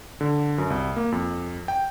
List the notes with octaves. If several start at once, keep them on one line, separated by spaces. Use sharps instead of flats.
D3
F#2
C2
A#3
F2
G5